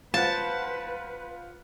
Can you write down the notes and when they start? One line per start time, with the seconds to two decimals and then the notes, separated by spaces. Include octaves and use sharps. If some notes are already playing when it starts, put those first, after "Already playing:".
0.14 F4 B4 C5 F#5 A5